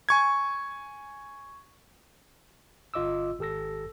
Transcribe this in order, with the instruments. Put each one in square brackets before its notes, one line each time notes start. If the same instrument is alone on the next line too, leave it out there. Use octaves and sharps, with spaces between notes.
[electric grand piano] G#5 C#6 G#6
[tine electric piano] G1 F4 D#5 D6 E6
G#1 G4 A4 E6 A#6